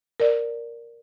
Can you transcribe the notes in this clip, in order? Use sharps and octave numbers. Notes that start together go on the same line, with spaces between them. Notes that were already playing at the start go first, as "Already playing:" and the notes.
A#4 D5